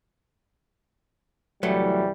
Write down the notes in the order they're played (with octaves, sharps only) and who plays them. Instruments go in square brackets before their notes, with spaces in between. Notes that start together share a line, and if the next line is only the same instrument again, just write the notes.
[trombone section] C2 E3 G3 [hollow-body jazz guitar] F#3 A3